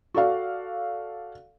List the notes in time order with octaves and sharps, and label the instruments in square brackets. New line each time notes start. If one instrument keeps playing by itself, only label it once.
[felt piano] F#4 A4 D5 F5